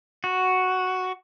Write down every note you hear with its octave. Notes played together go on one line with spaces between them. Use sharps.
F#4